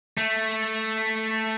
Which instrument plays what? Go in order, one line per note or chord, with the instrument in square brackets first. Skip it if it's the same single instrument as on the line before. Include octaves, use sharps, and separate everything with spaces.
[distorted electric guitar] A3